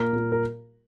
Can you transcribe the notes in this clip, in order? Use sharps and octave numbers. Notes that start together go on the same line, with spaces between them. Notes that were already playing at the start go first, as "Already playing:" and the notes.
Already playing: A#2 A#3 A#4
A#2 A#3
A#4